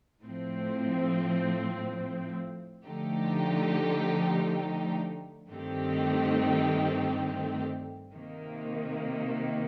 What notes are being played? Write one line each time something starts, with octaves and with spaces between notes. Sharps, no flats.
A2 F3 C4
D3 F3 A3 D#4 G4
G2 D#3 A3 C4 G4
C3 D#3 A#3